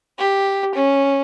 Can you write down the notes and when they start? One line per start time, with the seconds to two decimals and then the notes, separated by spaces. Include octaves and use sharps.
0.19 G4
0.75 C#4